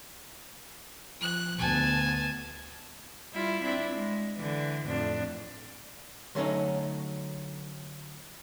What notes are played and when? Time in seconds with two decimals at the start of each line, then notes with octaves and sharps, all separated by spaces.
1.21 F3 F#6
1.58 D2 B3 G#5 A5
3.33 G3 E4 F4
3.63 C4 D4 E4
3.93 G#3
4.37 D3 E3
4.87 F2 A2 D4
6.35 D3 F#3 A3 C#4 D#4